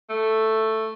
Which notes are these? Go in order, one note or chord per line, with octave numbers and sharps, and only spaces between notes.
A3